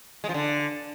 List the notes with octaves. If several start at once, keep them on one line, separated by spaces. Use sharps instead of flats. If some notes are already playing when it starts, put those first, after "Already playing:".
G#3
F3
D3